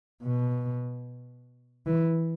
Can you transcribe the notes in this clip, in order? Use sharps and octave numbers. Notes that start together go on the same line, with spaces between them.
B2
E3